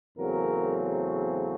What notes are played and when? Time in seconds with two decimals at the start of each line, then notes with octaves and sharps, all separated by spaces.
0.17 E2 C#3 F#3 A3 C4 A#4